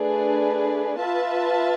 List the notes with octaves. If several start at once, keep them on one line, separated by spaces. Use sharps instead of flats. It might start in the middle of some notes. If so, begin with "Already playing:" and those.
Already playing: A3 D4 G#4 B4
F4 B4 E5 A5